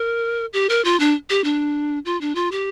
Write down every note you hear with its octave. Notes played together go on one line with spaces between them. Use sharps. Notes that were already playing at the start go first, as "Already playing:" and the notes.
Already playing: A#4
G4
A#4
F4
D4
G4
D4
F4
D4
F4
G4